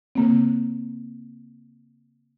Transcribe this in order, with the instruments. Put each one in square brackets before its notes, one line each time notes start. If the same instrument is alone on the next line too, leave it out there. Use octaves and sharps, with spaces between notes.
[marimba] C#3 A#3 C4